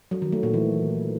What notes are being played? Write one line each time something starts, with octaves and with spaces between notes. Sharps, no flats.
F#3
D#3
A3
A#2
E3